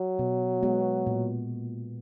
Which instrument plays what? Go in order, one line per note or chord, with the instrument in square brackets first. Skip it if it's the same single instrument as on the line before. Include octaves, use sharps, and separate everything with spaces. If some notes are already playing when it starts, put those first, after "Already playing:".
Already playing: [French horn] F#3
[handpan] B2
G#3 B3 F#4
A#2